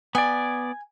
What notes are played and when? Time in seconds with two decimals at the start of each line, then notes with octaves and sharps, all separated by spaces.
0.15 B3 D5 G#5